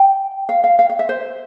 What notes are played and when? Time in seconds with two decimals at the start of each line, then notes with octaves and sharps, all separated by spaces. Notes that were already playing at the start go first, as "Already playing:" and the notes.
Already playing: G5
0.49 F5
0.64 F5
0.79 F5
0.89 F5
0.99 E5
1.09 C5